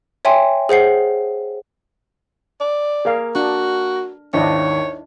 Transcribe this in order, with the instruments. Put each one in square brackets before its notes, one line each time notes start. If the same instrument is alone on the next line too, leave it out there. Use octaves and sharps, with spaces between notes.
[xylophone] C#5 E5 G5 G#5 C6
G#4 C5 F#5 C7
[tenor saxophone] D5
[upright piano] A#3 A#4 [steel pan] G#4 F5
[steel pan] D4 [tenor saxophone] F#4
[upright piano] G#1 D#2 [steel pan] D4 E4 D#5 [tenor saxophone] C#5